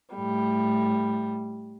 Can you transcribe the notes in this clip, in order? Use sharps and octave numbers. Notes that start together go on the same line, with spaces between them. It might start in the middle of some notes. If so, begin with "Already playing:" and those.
A2 G3